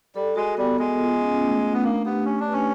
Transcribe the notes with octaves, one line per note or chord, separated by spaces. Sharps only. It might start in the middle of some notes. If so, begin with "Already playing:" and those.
G3 A4
G#3 F#4
G3 B3
G#3 B3
F4
C#4
A3
A3
B3
A#3 D4
B3 G4
C#4 G4
D4
B4
C#4